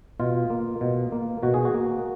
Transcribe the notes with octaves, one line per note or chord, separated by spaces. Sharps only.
B2 F4
A#3
B2
A#3
B2 F#4
G#4
F#4
A#3